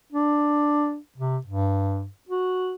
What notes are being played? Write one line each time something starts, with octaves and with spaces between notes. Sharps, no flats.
D4
C3
G2
F#4